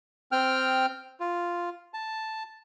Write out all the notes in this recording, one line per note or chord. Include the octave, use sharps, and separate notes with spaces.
C4 G5 F6
F4
A5